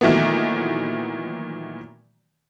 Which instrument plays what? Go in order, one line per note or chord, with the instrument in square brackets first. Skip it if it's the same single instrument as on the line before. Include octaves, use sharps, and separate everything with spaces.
[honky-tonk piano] A#2 D#3 E3 F#3 A3 B3